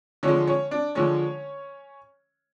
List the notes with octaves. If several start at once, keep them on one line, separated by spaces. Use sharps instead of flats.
D3 F3 G#3 C#4 C#5
C#4 C#5
D4 D5
D3 F3 G#3 C#4 C#5